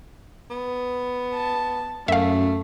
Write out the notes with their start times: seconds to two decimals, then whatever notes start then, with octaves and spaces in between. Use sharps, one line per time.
0.50 B3
1.34 A5
2.08 F#2 A3 E5 F5